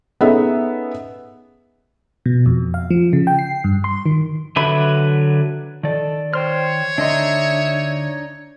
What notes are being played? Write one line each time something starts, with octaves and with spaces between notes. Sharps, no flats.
B3 C#4 D#4 G#4 A4 E5
B2
F2
F5
F3
C#3
G5
C7
G2
C6
D#3
D3 F#3 B4 E5 B5
D#3 A4 D5
C5 C#5 G5 C6 F6
D2 D4 D#4 D#5 E5 C6